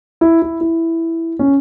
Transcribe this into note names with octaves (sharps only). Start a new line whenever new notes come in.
E4
E4
E4
C#4